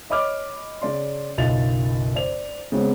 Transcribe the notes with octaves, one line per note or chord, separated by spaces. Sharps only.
C#5 D#5 B5 D6 F6
C#3 D5 C6
F#1 B1 F4 D#5 A6 F7
C5 D5 F7
C#3 G#3 B3 C4